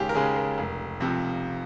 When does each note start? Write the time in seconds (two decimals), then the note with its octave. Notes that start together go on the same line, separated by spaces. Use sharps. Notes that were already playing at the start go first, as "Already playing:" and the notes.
Already playing: D#2 C#3 G#3 G4 G#4
0.09 A#4
0.15 C#3 G#3 G#4
0.36 A#4
0.58 F1
1.00 F2 C3 F3